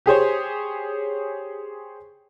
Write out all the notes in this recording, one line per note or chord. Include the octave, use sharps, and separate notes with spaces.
G4 G#4 C5 C#5